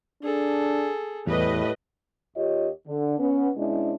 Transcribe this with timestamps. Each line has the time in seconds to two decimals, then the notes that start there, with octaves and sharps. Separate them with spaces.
0.23 D4 G#4 A4
1.27 E2 A2 G3 B4 D#5
2.36 D#2 F4 G4 C#5 D#5
2.88 D3
3.19 B3 C#4
3.57 B2 G#3 C#4 D4 E4